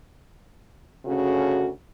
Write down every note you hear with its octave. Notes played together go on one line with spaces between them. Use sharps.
D2 C#3 C#4 F#4 A4